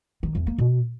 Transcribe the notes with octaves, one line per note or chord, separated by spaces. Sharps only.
D#3
E2
A#3
B2